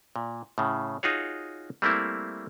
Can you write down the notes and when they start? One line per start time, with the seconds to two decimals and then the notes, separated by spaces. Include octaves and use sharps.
0.16 A#2
0.58 A2 C#3
1.03 D#4 F4 F#4 G#4 C#5
1.82 G3 A3 A#3 C4 E4